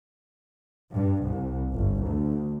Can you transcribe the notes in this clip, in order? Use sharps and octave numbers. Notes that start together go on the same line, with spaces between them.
G2
C2
G1
D2